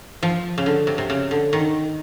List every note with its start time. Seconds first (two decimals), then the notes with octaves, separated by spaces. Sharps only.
0.23 F3
0.58 C#3
0.66 D3
0.87 C3
0.98 C3
1.10 C#3
1.31 D3
1.53 D#3